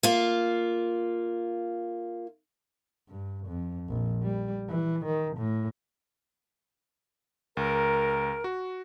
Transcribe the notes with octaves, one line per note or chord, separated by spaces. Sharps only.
A#3 F4
G2
F2
A#1
G3
E3
D#3
A2
C#2 A#4
F#4